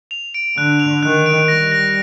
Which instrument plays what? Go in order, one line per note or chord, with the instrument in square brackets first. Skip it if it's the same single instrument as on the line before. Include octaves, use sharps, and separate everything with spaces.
[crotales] F7
D7
[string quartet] D3 [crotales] F#6
[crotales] F7
[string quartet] D#3 [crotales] F#6
[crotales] D7
[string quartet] G3 [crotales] A#6
[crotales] A#6